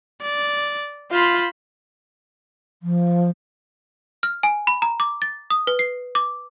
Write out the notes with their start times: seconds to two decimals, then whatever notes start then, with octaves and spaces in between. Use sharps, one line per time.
0.22 D5
1.11 F4 C5 B5
2.83 F3
4.23 F6
4.43 G#5
4.67 B5
4.82 A#5
5.00 D6
5.22 A6
5.50 D#6
5.67 B4
5.79 C7
6.15 D6